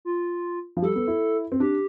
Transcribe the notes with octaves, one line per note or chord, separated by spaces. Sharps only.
F4
F3
G3 A4
B3
E4
C4
D4 G4